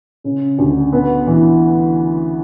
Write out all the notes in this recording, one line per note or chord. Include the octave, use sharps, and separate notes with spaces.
C#3
D2
B3
E3